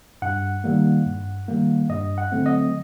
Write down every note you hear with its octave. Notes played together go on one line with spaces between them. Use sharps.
G2 F#5
D#3 G3 A#3
G2
D#3 G3 A#3
G2 D#5
F#5
D3 F#3 A3 C4
D#5